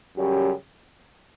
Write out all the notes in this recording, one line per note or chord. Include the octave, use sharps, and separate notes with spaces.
F#2 C#3 G3 C#4 G4